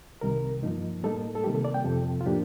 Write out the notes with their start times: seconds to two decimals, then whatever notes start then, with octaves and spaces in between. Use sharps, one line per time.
0.21 C2 C3 D#3 G3 A#4
0.63 G2 F3 A#3 D#4
1.03 A2 G3 A#3 D#4 A4
1.35 A4
1.44 C3 D#3 G3 A#3 G4
1.55 A4
1.65 D5
1.74 G5
1.85 F2 C3 F3 A4
2.21 F4
2.26 A2 F3 A#3 D4 G4